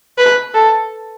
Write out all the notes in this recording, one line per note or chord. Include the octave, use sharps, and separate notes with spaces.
B4
A4